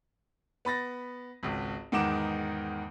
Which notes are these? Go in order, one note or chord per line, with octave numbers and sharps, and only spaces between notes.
B3 B5 A6 A#6
G#1 C#2
E2 G#2 D#3 F#5 D6 E7